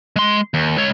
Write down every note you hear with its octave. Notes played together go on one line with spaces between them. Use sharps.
G#3 C6
D#2
G#3 C#5